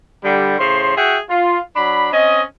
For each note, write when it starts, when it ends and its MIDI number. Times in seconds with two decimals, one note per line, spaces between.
0.24 0.58 50
0.24 0.58 55
0.59 0.94 45
0.59 0.94 49
0.59 0.94 72
0.59 0.94 84
0.97 1.18 66
0.97 1.18 68
0.97 1.18 76
0.97 1.18 78
0.97 1.18 79
1.30 1.59 65
1.76 2.12 54
1.76 2.12 62
1.76 2.12 83
2.13 2.42 60
2.13 2.42 61
2.13 2.42 75